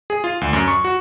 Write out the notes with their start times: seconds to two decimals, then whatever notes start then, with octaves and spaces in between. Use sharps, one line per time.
0.10 G#4
0.24 F4
0.41 D2
0.53 F#2
0.68 C#6
0.84 F#4